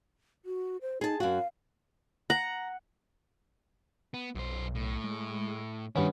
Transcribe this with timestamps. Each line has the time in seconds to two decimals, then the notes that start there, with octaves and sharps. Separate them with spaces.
0.45 F#4
0.82 C5
1.01 D#4 G#4 A5
1.20 F#2 F#4 F5
2.30 F#5 A#5
4.14 B3
4.35 B1 F#2 C5
4.75 A2
5.04 G#3
5.96 G2 D#3 B3 C#4 E4 F#4